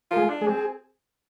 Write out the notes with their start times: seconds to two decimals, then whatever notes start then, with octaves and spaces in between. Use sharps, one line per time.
0.11 F4 A#4
0.17 G#3 G#4
0.29 D4
0.41 G#3 G#4
0.48 C4
0.54 G#4